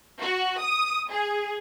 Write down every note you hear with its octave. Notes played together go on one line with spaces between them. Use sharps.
F#4
D#6
G#4